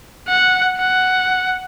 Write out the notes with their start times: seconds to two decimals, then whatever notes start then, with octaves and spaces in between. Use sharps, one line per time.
0.28 F#5
0.78 F#5